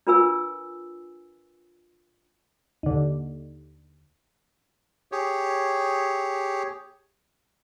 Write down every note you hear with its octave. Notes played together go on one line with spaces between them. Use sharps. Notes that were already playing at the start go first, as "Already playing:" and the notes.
D4 F4 A#4 B4 G#5 E6
D#2 D3
G4 G#4 C#5